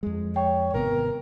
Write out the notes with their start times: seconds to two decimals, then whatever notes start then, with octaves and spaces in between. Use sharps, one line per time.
0.03 F2 G#3
0.36 C#5 G5
0.74 G#1 C3 B3 A#4